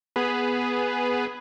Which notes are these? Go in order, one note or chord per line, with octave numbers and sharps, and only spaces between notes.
B3 G#4 B4